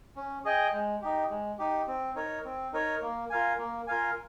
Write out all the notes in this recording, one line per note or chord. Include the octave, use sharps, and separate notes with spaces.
C#4
G#4 D#5 G5
G#3
D#4 G4
G#3
D#4 G4
C4
D#4 A#4 C#5
C4
D#4 A#4 C#5
A#3
F4 A#4 F5 G#5
A#3
F4 A#4 F5 G#5